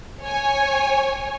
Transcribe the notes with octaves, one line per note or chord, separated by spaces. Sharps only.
C#5 G#5